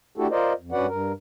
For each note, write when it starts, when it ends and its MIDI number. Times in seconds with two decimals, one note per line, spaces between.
0.18 0.27 57
0.18 0.27 62
0.18 0.27 64
0.18 0.27 66
0.18 0.27 67
0.18 0.27 69
0.31 0.53 65
0.31 0.53 70
0.31 0.53 72
0.31 0.53 74
0.31 0.53 75
0.59 0.72 41
0.72 0.87 43
0.72 0.87 61
0.72 0.87 66
0.72 0.87 71
0.72 0.87 74
0.72 0.87 78
0.88 1.13 43
0.88 1.13 70